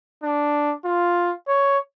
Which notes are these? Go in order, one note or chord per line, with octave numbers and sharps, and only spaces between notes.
D4
F4
C#5